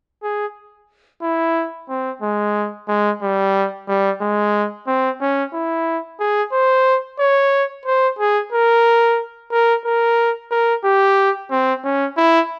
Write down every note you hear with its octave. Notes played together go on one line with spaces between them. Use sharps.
G#4
E4
C4
G#3
G#3
G3
G3
G#3
C4
C#4
E4
G#4
C5
C#5
C5
G#4
A#4
A#4
A#4
A#4
G4
C4
C#4
E4